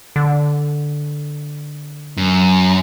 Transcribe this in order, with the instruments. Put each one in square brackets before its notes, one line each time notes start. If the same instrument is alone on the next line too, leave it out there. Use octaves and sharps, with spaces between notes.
[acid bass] D3
[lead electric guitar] F#2